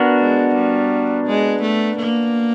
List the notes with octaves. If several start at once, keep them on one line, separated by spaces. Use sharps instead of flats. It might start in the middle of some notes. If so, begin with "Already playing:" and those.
Already playing: B3 D4 F#4 A#4
G#3
G3
G#3
A3
A#3